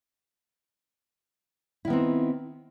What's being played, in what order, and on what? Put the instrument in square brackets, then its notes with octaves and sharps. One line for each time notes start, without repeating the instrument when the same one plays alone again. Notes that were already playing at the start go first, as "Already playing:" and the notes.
[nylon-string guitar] E4
D#3
B3
C4